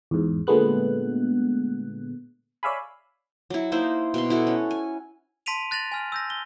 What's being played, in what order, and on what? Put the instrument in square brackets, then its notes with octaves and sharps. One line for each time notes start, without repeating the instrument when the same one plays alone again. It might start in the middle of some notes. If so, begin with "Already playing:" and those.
[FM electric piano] E2 G#2
A#2 D3 G#3 A3 B3 F#6
C#5 D5 E5 F5 G#5 B5
[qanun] F#3 E4
A#3 D#4 E4 C5
B2 C6
E4 F#4 A4
C#4
G#5
[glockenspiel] A5 C6 B6 D7 D#7 F7
F#6 A6 A#6 F7 F#7
G#5 F6
E6 G6 A#6
G7